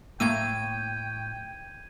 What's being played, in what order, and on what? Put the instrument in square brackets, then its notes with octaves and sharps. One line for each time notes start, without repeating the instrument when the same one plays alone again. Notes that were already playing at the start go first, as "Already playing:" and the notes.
[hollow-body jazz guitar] A2 [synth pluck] A3 A#3 E6 [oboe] G5 [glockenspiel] G#6 D#7